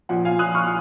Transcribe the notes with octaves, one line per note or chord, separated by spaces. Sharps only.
A#2 F3 F#5
F5 G#5
A#2 F3 D#6 F#6
C#6 F6